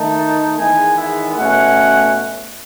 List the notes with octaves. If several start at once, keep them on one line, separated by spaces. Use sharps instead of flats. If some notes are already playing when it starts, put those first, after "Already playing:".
Already playing: D#3 A3 D#4 A5
E2 D#3 G#3 B3 G#5
E5
B2 A3 C#4 F#5